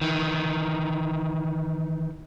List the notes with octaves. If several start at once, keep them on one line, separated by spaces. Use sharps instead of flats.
D#3 E3